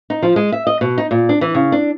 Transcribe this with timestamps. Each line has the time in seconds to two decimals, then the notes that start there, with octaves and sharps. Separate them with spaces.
0.10 D#4
0.23 F3
0.36 G#3
0.52 E5
0.67 D#5
0.81 B2
0.98 D#4
1.11 A#2
1.29 D4
1.41 E3
1.54 C#3
1.72 D4